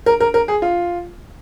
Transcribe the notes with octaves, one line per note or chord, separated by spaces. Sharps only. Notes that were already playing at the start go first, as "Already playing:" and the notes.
A#4
A#4
A#4
G#4
F4